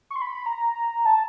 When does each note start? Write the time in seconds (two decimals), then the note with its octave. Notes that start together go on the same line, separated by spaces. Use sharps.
0.11 C#6
0.16 C6
0.22 B5
0.35 B5
0.46 A#5
1.05 A5